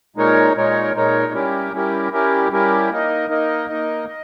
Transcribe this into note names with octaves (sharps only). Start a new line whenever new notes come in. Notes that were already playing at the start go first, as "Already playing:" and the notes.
A#2 G#3 D#4 A#4 C#5
A#2 G#3 D#4 A#4 C#5
A#2 G#3 D#4 A#4 C#5
G3 C#4 E4 G4 A#4
G3 C#4 E4 G4 A#4
G3 C#4 E4 G4 A#4
G3 C#4 E4 G4 A#4
A#3 D#4 A#4 D#5
A#3 D#4 A#4 D#5
A#3 D#4 A#4 D#5
D#5